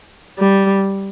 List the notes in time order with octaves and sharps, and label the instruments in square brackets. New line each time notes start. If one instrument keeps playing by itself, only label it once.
[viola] G3